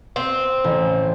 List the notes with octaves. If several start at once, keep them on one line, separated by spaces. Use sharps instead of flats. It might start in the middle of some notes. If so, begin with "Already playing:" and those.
C4
A1